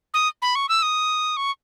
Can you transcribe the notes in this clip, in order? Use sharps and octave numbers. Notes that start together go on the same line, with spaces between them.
D#6
B5
C#6
E6
D#6
C#6